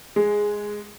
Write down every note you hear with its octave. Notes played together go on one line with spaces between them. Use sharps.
G#3